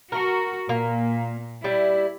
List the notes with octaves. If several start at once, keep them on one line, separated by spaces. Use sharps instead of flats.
F#4 A#4
A#2 A#3
G3 E4